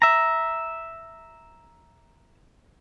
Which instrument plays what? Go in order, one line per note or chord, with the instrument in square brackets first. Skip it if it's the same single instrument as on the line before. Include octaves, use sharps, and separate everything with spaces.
[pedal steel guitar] E5 A#5